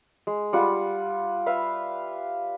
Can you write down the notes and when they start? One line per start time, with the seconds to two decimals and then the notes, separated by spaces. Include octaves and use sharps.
0.27 G#3
0.53 G3 F4 F#5
1.46 B4 E5 F5